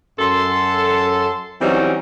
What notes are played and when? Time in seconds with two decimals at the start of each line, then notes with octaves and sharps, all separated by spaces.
0.19 F#2 A4 C6
1.61 E3 F#3 G3 C4 C#4 D#4